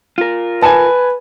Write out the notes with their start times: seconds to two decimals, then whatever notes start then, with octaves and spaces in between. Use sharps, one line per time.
0.18 F4 A#4
0.62 B4 G#5 A5